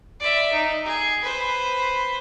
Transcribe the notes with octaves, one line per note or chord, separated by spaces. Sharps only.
D5 E5
D#4
G#4
B4 C5